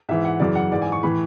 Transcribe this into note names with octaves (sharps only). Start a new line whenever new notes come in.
G#2 E3 E5
F#5
F#2 C#3 E3 D5
F#5
G#2 E3 D5
G#5
C#6
A2 E3 B5